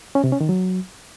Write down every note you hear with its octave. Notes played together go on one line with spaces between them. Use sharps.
C#4
C3
C#4
D#3
F#3